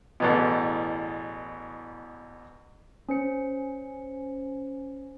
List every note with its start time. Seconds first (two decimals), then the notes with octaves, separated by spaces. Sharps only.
0.20 A1 E2 B2
3.09 C#4 C5 C#7